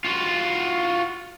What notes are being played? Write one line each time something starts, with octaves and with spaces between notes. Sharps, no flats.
F4 F#4